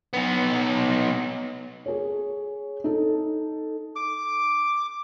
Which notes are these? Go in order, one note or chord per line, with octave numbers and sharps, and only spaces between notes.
B3 D#4
G#4 C#5
D#4 A4
D6